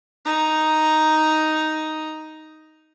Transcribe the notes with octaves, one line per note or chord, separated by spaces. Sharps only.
D#4 A#5